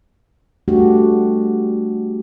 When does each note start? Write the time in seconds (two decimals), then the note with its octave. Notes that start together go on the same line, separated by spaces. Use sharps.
0.68 G3 A3 D4 F#4 G4